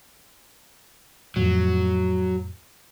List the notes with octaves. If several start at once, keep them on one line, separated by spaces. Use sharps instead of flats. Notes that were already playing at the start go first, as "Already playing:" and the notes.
F2 A2 F#3